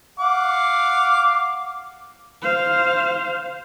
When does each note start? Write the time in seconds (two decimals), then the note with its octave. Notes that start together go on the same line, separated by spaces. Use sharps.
0.19 F5 F#5 D6
2.42 C5 F5